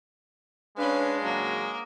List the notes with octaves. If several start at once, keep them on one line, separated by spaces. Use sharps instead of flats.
G#3 C#4 D4 B4 F5
G#2 C#3 F#3 A#3